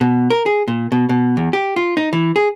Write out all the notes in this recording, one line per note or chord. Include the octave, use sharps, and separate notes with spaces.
B2
A#4
G#4
A#2
B2
B2
E2
G4
F4
D#4
E3
G#4